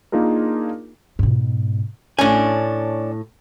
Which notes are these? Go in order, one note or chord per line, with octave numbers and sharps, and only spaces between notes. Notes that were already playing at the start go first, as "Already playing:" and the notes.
A#3 D4 D#4 F4 G#4 A#4
G#2 B2
A2 C#4 D4 G#5